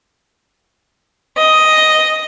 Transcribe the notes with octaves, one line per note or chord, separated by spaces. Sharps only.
D#5